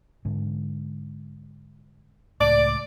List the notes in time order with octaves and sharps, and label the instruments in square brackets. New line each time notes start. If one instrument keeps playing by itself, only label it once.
[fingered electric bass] G#2 D3
[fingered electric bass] C#2 A2 [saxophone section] D5